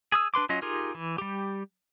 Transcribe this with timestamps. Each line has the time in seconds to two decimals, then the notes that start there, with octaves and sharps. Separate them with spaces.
0.12 G#4 D#6 E6
0.34 D4 B4 C6 D6
0.49 F#3 C#4 F4 D#5
0.62 D#4 F4 G4 G#4 A#4
0.95 E3
1.18 G3 G4